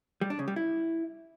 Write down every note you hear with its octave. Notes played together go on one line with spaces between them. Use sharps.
G3
D4
C#3
G3
E4